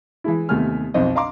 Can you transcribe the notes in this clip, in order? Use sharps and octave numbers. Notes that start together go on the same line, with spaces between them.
E3 G#3 E4
D#2 C3 A3 B3 G#5 F6
B1 F2 C4 D#5
D#5 F5 A#5 C6 D6